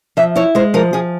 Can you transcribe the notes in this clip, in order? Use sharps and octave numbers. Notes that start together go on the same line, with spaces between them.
F3 E5
E4 C#5
G#3 C5
F3 A#4
F3 G#4